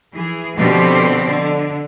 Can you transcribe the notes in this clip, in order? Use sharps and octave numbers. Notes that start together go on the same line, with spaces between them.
E3 G#4
B2 D3 F3 C4 G4
D3